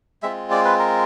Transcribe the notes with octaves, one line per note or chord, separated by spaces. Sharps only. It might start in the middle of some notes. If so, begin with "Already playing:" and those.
G#3 C4 F4 E5
D5
B4
A#4